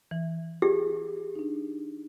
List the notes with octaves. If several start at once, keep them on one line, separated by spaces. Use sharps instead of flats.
E3
G4 G#4
D4 D#4